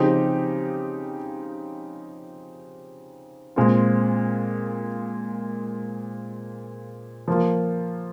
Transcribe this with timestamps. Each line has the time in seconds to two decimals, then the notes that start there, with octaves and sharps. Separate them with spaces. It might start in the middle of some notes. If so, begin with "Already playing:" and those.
Already playing: C#3 F3 C4 D#4 G4
3.56 A#2 G#3 C4 F4
7.28 F3 A#3 F4